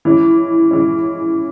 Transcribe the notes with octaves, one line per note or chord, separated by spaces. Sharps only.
E3 G#3 C#4
E3 G#3 C#4